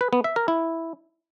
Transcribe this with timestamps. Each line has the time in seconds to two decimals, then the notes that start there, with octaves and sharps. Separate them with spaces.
0.01 B4
0.13 B3
0.24 E5
0.36 A#4
0.48 E4